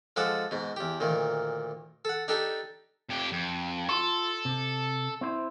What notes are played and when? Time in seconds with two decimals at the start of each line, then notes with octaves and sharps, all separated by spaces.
0.16 F3 G#3 A4 F#5 D6 D#6
0.51 G#2 B2
0.76 E2 G4
1.00 D2 A#2 D#3
2.05 A4 F#5
2.28 D4 D#4 G4 A4
3.09 F2 G4
3.32 F2
3.89 F4 A4 C6
4.45 C3
5.21 C4 E4 C5